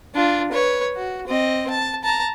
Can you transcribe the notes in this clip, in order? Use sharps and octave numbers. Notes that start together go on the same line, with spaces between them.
D4 F4
B4 C#5
F#4
C4 D#5
A5
A5 A#5